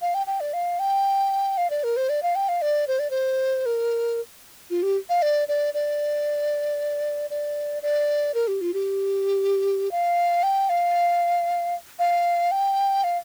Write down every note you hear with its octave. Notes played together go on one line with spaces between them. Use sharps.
F5
G5
G5
D5
F5
G5
F5
D5
A#4
C5
D5
F5
G5
F5
D5
C5
D5
C5
A#4
F4
G4
F5
D5
D5
D5
D5
D5
A#4
G4
F4
G4
F5
G5
F5
F5
G5
F5